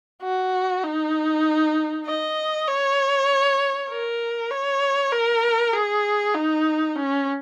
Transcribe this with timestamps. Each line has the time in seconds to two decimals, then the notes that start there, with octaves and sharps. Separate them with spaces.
0.22 F#4
0.84 D#4
2.06 D#5
2.67 C#5
3.90 A#4
4.51 C#5
5.12 A#4
5.73 G#4
6.35 D#4
6.96 C#4